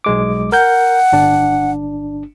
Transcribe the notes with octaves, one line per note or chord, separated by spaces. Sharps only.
B1 G#3 D6
A#4 F#5 G6
G1 D4